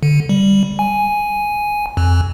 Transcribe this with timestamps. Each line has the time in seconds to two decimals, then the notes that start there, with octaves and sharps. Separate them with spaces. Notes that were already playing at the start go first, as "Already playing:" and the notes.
0.03 D3
0.29 G3
0.79 G#5
1.97 F2